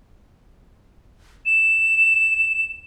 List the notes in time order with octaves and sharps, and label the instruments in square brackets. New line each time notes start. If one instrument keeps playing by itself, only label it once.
[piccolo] E7